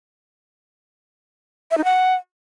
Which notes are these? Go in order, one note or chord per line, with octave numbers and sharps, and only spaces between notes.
E5
D#4
F#5